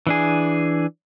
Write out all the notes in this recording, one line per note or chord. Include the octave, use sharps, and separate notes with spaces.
E3 D4 G#4